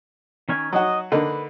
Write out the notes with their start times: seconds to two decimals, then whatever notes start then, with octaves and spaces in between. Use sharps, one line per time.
0.49 D#3 C#4 G#5
0.72 F#3 D#4 F#4 D#5
1.12 D3 A#3 D#4 B4